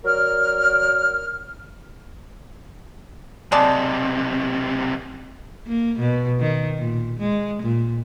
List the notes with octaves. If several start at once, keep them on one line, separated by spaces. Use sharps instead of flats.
F#3 A#4 D5 F6
B1 C3 G#3 D5 A5
A#3
B2
D#3
A#2
G#3
A#2